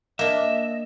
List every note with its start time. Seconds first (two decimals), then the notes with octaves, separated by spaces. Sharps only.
0.19 A#3 D4 D#5 E5